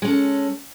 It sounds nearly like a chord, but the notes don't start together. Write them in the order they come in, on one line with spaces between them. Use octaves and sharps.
G#3 C#4 A4